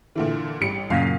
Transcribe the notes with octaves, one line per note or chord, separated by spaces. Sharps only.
A#2 D3 E3
A1 G3 C#7
F#2 A#2 C#3 F5